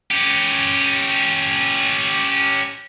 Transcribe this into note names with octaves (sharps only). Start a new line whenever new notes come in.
C#4 G4